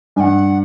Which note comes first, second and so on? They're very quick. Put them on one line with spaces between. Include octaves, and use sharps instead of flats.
G2 G#5 F#5